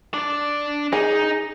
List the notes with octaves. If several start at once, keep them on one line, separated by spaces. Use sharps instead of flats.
D4 D5
D#4 G#4